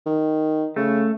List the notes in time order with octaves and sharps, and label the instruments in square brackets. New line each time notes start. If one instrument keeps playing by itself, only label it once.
[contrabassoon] D#3
[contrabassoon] C#3 [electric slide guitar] A3